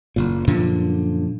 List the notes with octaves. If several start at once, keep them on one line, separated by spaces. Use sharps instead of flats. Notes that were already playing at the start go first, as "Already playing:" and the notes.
F#1 A#2
F#2 A#2 D3 F3